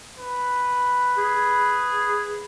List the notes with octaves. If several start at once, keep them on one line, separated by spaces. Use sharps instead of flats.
B4
G#4